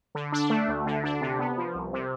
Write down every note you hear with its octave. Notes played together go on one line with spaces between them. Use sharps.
D3
D4
A3
D2
D3
D4
C3
B3
F3
C2
C3